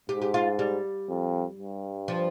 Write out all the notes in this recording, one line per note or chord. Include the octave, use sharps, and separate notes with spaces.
G#2 G4
G4
F4
G3
F2
G2
F3